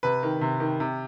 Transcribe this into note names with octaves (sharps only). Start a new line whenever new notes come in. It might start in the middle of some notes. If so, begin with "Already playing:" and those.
C3 B4
D#3
C3
D#3
C3